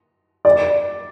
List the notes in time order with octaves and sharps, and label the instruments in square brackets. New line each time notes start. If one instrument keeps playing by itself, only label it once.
[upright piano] D5